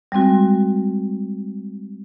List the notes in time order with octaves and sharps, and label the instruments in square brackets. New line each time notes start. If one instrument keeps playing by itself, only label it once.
[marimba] G3 G#3 C4 F#4